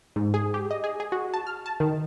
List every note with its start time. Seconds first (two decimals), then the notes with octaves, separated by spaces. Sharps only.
0.16 G#2
0.34 G#4
0.54 G4
0.71 D#5
0.84 G#4
1.00 G#4
1.12 F#4
1.34 A5
1.47 F6
1.66 A5
1.80 D#3